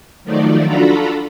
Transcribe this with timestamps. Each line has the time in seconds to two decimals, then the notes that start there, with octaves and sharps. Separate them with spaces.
0.24 D#3 F3 F#3 A3 D#4 D5
0.65 D4 F4 F#4 A4 A#5 B5